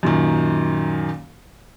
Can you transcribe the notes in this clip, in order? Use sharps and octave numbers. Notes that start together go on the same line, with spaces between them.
F#2 A#2 D#3